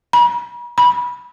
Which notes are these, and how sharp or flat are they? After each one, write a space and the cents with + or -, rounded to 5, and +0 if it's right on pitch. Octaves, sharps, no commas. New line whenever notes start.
B5 -45
B5 -20